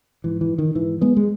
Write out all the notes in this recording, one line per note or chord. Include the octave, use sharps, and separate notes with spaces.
G#2 E3
E3
D#3
G#2 E3
G#3 B3
G#3